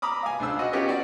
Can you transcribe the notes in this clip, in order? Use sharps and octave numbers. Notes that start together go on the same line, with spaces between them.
A#5 B5 D6 D#6
F5 G#5
C#2 D4 C5 E6
F#4 D#5
B3 C#4 D#4 F4 G4 C#5
F#4 D5 F#5